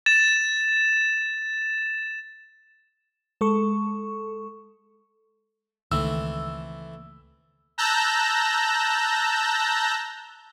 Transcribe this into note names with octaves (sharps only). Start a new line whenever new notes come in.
A6 E7
G#3 A4 C#6
C#2 D#3 E3 A3 C4 E6
A5 A#5 E6 F#6 G6 A#6